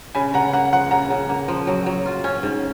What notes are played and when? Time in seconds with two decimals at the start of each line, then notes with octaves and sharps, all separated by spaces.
0.15 C#3 G#5 B5
0.34 C#3 F#5 A#5
0.53 A#3 F#5
0.73 F3 F#5
0.91 C#3 F#5 A#5
1.10 C#3
1.29 A#3
1.48 F3
1.67 F#3
1.86 F#3
2.06 F4
2.24 C#4
2.43 G#2